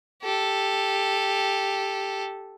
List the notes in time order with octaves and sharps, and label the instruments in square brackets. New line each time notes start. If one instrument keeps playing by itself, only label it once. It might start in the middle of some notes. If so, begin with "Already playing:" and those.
[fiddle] G4 A4